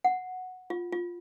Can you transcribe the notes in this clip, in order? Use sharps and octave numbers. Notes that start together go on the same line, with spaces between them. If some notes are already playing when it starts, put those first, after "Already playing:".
F#5
F4
F4